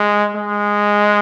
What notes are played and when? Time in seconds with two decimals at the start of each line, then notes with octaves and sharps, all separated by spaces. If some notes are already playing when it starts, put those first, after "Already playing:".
Already playing: G#3
0.35 G#3